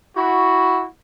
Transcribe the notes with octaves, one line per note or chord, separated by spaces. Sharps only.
E4 F#4